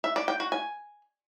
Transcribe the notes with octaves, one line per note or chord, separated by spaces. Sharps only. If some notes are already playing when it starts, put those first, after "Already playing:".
E5
D5
G5
F#4
G#5